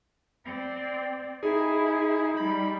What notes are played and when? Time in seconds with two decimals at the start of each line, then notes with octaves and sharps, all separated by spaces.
0.45 C4 D5
1.43 D#4 E4 G#4
2.37 G3 B5